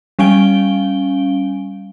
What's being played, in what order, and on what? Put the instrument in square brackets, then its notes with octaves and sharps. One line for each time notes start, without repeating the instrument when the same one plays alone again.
[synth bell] G3 C#4 F5 G#5 D7 G7